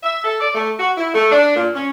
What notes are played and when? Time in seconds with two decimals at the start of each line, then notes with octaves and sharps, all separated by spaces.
0.03 E5
0.25 A4
0.41 D5
0.55 A3
0.80 F#4
0.98 E4
1.15 A3
1.32 D4
1.56 A#2
1.75 C#4